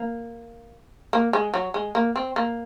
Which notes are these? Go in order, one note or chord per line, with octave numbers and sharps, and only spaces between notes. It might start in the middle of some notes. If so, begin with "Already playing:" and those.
Already playing: A#3
A#3
G#3
F#3
G#3
A#3
C4
A#3